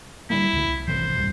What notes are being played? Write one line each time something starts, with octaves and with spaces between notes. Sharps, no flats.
D3 G3 A#3 E4
C#2 D3
C2
G#1 C3 E3 C5
D#1 C2 G2